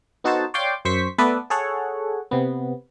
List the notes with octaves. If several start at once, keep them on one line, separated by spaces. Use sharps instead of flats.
B3 D#4 F#4 A4 C5 A5
C#5 D5 F5 G5 C6 D6
F#2 C5 C#6 B6
A3 B3 A4 B4 D5 E5
G#4 A4 C#5 F#5
C3 B3